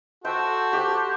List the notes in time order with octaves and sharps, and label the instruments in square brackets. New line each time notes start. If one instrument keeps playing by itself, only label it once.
[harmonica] F#4 A4 [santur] C5 E5 G5
[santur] G4 C5